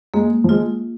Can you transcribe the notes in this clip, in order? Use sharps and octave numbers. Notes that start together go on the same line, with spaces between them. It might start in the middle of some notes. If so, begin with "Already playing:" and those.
G#3 A#3
F3
G#3 F4